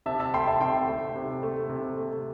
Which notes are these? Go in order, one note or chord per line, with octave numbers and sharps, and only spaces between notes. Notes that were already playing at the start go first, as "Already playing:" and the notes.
C3 E5 A5
E5 A5
A3 G5 C6
E5 A5
C3 G5 C6
A3
C3
A3
C3
A3